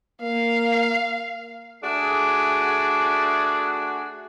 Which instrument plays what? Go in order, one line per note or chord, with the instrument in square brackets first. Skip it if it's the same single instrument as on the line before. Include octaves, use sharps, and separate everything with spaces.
[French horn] A#3 [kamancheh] F5
[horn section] A3 D4 F#4 G#4